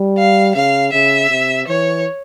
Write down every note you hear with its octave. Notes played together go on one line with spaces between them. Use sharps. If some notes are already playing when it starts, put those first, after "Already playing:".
Already playing: G3
F5
C#3 F5
C#3 E5
C3
E3 C#5